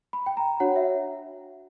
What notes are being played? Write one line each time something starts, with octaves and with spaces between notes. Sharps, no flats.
B5
G5
A#5
D4 F#4 C#5 F#5
E5